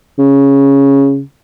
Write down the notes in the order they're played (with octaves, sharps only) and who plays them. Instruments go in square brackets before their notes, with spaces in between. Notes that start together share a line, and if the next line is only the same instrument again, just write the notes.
[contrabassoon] C#3